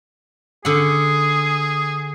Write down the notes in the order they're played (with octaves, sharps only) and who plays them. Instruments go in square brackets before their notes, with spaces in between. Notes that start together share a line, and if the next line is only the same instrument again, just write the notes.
[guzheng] D3 F#5 [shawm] G#4